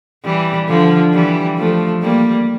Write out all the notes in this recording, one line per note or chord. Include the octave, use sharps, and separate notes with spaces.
E3 G3
D3 F3
E3 G3
F3 A3
G3 A#3